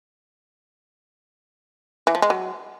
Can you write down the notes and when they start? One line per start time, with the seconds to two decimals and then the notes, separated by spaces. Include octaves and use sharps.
2.07 E3
2.15 F3
2.22 G#3
2.30 F#3